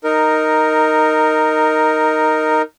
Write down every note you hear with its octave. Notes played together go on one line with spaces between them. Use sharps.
D#4 A#4